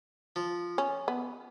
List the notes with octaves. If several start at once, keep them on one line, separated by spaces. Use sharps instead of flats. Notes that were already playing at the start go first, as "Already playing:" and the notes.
F3
C#4
B3